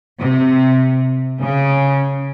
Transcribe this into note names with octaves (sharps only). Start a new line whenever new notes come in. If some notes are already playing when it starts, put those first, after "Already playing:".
C3
C#3